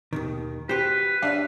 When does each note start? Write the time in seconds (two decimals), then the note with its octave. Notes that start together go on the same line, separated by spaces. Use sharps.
0.13 D#2 B2 D#3
0.69 F#4 G4 B4 C5
1.22 D4 C#5 E5 F5